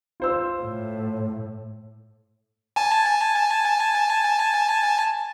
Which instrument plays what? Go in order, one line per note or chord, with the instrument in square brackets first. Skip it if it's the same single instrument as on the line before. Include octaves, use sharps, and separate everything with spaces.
[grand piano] F4 C5 E6
[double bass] A2
[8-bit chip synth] G#5 A5